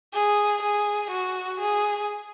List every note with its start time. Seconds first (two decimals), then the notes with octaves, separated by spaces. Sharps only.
0.14 G#4
0.62 G#4
1.11 F#4
1.60 G#4